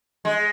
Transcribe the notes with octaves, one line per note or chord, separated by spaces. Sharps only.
G#3